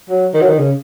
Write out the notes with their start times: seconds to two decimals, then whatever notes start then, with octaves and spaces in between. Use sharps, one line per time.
0.09 F#3
0.34 D#3
0.41 F#3
0.48 D#3
0.59 C#3